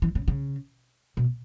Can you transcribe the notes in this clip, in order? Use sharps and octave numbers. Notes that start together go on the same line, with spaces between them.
E3
C#3
C#3
B2